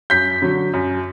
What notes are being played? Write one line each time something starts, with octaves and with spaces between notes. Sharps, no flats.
F#2 G6 B6
D3 F#3
F#2